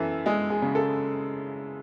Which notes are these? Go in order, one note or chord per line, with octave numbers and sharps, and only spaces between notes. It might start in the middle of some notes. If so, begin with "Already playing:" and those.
Already playing: F#2 E3 A4
G#3 G#4
G#4
C#3
A4